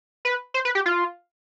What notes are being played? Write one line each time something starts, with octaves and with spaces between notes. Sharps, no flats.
B4
C5
B4
G4
F4